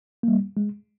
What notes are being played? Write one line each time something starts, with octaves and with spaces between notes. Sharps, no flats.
G3 A#3
G#3